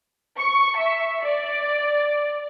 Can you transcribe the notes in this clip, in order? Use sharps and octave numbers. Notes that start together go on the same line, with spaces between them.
C#6
E5
D5